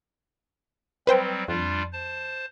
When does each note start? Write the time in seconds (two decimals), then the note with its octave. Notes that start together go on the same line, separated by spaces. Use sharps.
1.07 F#3 G3 C4 B4 C5 G5
1.48 F2 G3 D4 F4
1.93 C5 A5